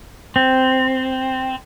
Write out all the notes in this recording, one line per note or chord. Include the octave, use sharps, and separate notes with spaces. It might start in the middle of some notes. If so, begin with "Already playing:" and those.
C4